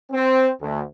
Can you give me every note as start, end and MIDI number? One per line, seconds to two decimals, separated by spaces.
0.12 0.48 60
0.61 0.82 38